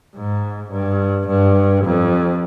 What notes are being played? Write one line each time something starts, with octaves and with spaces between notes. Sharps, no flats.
G#2
G2
G2
F2